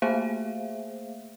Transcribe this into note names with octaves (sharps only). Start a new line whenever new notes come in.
A3 A#3 G#4 C5 E5 F5